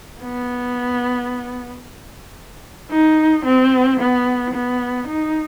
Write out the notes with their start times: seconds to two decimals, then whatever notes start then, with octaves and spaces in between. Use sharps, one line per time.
0.21 B3
2.91 D#4
3.45 C4
3.99 B3
4.54 B3
5.07 D#4